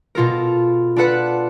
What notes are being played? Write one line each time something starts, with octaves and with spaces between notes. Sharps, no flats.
B2 F4 A4 A#4
D4 F4 A4 B4 F#5